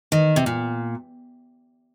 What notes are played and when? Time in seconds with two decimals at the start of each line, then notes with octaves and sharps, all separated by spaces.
0.12 D#3
0.36 C3
0.46 A#2